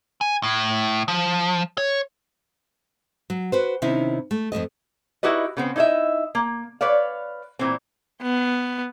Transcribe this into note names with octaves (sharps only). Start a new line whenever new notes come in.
G#5
A2
F3
C#5
F#3
F#4 B4 C5
C3 D#3 C#4 D#4 E4
A3
F2 B2 A3 D#5
D#4 E4 F#4 G4 B4 D#5
C#3 B3 C4
D#4 E4 C#5 D#5 E5
A#3
B4 C#5 D5 F5
A#2 E3 C4
B3